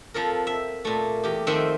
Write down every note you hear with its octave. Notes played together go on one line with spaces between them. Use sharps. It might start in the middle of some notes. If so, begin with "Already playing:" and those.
F2 F3 A4 A#4
E5
A#2 A3
E2 G4
F2 D#3 C4 E5 F#5 G5